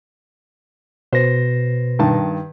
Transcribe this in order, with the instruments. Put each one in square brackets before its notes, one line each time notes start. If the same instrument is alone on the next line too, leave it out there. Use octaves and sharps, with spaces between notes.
[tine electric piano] B2 B4 A#6 [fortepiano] C5
[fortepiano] G2 D#3 A5